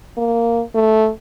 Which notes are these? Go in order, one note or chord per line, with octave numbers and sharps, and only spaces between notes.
A#3
A3